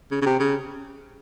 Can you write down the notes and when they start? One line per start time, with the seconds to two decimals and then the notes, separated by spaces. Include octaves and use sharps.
0.11 C#3
0.22 C#3
0.26 C3
0.39 C#3